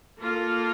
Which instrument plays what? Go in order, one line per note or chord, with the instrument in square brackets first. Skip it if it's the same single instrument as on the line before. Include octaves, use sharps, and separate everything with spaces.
[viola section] A#3 F4 A4